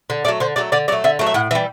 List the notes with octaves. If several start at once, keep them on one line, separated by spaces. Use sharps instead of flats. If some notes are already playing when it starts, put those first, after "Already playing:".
D3
F#3 A3 D5
D3 C5
F#3 A3 D5
D3 D5
F#3 A3 D5
D3 E5
F#3 A3
E5
A2 F#5
E3 G3 E5